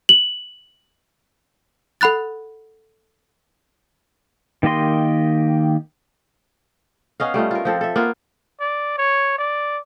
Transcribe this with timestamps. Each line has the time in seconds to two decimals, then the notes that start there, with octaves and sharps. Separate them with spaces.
0.09 F#7
2.01 A4 F#5 B5 F#6 A6
4.63 D#3 A#3 G4 D#5 C6
7.20 B3 C#4 D#5 F5
7.34 G3 A3 F4 D#5
7.51 F4 A#4
7.65 F3 C4 A4
7.81 A4 E5
7.96 A#3 B3 F4
8.60 D5
8.98 C#5
9.39 D5